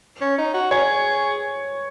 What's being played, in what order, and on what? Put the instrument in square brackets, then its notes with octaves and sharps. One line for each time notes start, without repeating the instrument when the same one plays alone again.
[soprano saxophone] C#4
D#4
F#4
[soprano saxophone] G#4 [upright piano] C#5